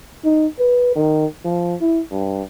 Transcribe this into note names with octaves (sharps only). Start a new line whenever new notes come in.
D#4
B4
D#3
F3
E4
G2